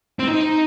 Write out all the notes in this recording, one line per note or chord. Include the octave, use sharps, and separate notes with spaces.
C4
D#4